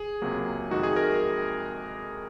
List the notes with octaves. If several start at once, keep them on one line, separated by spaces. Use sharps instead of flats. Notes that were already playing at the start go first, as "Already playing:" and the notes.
Already playing: G#4
C#2 C3 F#3 A#3
F2 C3 D#3 G#3 D#4 F#4
G#4
A#4